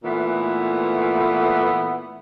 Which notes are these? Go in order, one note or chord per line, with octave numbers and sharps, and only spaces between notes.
A#2 E3 A3 B3